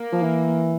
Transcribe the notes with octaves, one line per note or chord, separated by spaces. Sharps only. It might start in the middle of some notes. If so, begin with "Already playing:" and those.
Already playing: A#3
F3
E3